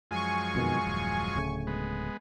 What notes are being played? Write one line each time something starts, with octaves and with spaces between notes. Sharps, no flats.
F#2 F3 G#3 G#5 C#6
F2 B2 D#3
D#1
D1 C#3 A3
G#3 B3